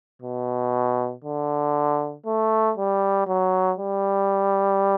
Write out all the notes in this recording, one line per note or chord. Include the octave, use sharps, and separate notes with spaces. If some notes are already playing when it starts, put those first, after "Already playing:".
B2
D3
A3
G3
F#3
G3